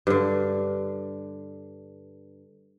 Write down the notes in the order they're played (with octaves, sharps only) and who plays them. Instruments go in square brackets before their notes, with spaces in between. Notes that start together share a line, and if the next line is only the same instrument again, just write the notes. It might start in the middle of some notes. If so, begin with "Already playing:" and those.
[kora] G2 D3